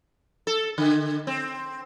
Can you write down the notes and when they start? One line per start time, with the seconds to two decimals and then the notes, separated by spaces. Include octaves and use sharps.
0.47 A4
0.78 D3
1.27 C4